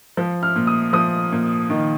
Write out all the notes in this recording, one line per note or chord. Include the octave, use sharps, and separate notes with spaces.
F3
F6
A#2
D#6
F3 D#6
A#2
D#3